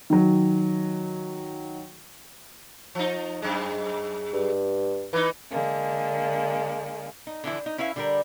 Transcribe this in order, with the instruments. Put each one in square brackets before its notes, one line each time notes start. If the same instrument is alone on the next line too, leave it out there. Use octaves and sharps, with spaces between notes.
[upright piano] D#3 F#3
[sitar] F3 D#4
F#2 G#3
[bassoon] G2
[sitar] E3 D#4 [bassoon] B4
[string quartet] D3 G#3 A#3
[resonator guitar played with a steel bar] D#4
D3 E3 F3 E4
D#4
C#4 E4 B4 E5 F5
D3 G3 A#4